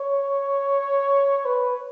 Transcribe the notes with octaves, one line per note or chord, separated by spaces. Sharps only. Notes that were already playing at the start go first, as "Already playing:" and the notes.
Already playing: C#5
B4